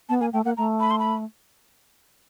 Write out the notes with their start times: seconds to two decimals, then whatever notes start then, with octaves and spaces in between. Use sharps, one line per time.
0.09 B3 A5
0.21 A#3 G#5
0.33 A3 G5
0.45 A#3 F#5
0.57 A3 A#5
0.80 B5
0.91 C6
0.99 B5